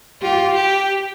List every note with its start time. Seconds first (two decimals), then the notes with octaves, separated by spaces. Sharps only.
0.21 F4 G4
0.55 G4